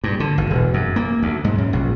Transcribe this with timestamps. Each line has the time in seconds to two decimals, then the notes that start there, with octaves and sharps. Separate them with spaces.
0.04 G2
0.20 D3
0.38 G#1
0.50 E1
0.74 F#2
0.96 A#3
1.22 D2
1.44 G#2
1.58 F#2
1.73 A#1